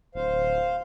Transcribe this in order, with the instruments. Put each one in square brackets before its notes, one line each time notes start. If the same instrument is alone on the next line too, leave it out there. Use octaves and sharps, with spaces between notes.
[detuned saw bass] D1 [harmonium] C5 F5